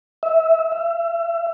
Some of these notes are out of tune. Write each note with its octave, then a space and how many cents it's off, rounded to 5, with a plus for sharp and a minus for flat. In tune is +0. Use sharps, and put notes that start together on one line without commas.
E5 -15
E5 +40